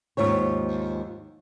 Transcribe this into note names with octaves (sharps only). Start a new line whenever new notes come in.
D#2 G#2 F3 C#5